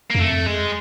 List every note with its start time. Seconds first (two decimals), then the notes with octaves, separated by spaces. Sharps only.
0.10 A#3
0.15 F#2
0.18 F2 A3
0.46 G#3